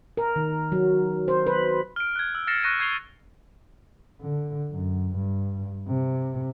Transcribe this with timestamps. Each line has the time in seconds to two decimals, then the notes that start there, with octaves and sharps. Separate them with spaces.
0.17 A#4
0.36 D#3
0.72 F#3
1.28 C5
1.47 B4
1.96 F6 D7
2.16 F#6 G#6
2.35 E6
2.47 F6 A6 A#6 C7 C#7 E7
2.64 C#6 F#6 A#6 D#7
2.80 C#6 G#6 C7 D7 F7 G7
4.21 D3
4.71 F#2
5.15 G2
5.88 C3